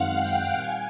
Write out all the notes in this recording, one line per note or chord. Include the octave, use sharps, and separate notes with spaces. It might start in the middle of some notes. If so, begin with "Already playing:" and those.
Already playing: F#2 D#3 G#3 C4 F5 F#5
G5
A#2 G3 G#5